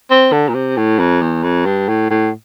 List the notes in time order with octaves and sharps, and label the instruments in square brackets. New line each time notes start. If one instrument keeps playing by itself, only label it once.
[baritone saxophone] C4
D3
A#2
C3
A2
F2
E2
F2
G2
A2
A2